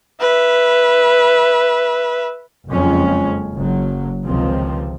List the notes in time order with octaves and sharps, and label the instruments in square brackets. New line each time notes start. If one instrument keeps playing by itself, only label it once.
[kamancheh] B4 E5
[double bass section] F#1 F2 G#3 C#4
F#1 F#3
C#2 C3 D#3 F3 C4